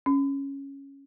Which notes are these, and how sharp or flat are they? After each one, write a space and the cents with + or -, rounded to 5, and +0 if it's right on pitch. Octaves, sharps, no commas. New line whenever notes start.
C#4 -5